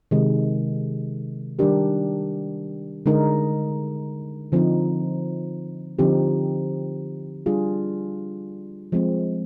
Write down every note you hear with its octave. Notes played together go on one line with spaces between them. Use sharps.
C3 D#3 G#3
D#3 G3 D4 G4 A#4
D3 G#3 D#4 A#4
D3 F3 C4 D#4
D3 F3 C4 D#4 G4
G3 D4 F4 G#4
F3 G#3 C4